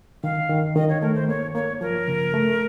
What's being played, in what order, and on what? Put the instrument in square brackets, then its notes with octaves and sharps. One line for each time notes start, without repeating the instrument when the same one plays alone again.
[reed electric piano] D#3 [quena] F5
[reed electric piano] D#3
[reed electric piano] D#3 [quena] D#5
[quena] C#5
[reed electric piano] A3 [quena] A#4
[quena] C5
[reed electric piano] A#3 [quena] C#5
[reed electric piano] A#3 [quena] C#5
[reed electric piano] F3 [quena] A#4
[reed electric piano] C#3
A3